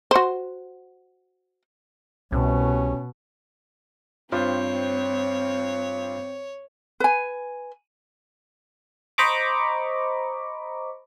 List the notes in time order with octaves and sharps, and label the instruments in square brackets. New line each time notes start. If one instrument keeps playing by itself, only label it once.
[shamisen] F#4 C5
[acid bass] C2 [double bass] B2 [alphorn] C#4
[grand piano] G2 F4 C5 [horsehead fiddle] C4 [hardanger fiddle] C#5
[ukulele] B4 G#5
[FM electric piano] C5 D#5 A#5 B5 C#6 D6